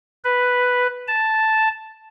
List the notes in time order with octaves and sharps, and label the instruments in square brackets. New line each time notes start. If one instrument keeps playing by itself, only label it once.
[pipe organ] B4
A5